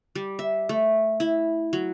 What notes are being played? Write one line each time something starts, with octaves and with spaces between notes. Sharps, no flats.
G3
E5
A3
E4
F#3